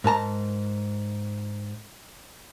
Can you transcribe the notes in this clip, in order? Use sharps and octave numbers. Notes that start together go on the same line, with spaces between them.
G#2 A#4 A5 A#5